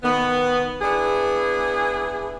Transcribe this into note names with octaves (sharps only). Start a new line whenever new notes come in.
D#3 B3
B3 D4 E4 G#4